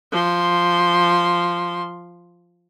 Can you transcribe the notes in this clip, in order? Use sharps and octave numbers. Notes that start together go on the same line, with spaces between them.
F3 C6